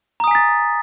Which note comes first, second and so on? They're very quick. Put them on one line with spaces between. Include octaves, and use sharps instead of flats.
A#5 D#6 G#5 B6 A6